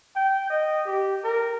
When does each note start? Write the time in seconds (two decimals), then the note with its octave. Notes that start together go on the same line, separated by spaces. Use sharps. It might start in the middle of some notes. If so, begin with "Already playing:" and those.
0.16 G5
0.50 D#5
0.86 G4
1.24 A#4